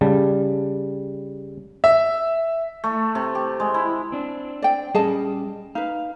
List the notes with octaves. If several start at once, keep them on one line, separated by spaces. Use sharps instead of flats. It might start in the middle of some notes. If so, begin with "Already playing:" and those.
C#3 G3 A5
E5
A3
C3
G4
G#3
E4
C4 D4
D5 G5
G3 C#4 G#4 D#5 A5
D#4 B4 F5